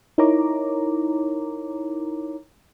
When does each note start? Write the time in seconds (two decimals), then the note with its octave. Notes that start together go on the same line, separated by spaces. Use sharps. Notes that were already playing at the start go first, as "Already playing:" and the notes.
0.18 D#4 E4 A#4 C#5 A#5 D6